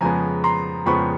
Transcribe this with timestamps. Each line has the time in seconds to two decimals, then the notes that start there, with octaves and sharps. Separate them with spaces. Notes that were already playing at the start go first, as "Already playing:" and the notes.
0.01 F2 C#3 F3 G#3 B3 G#5 A#5
0.44 A#5 C6
0.86 F2 C#3 F3 G#3 B3 B5 C#6